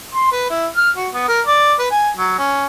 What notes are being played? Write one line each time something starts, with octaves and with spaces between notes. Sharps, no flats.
C6
B4
E4
F6
F#4
B3
A#4
D5
B4
G#5
F#3
C#4